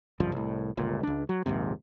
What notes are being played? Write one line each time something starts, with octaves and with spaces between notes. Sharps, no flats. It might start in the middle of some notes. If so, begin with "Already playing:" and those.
G#1 C#2 G2 F3
C2 A2
G1 C#2 A#2
C#2 D4
F#3
A#1 D#2 G#2 C3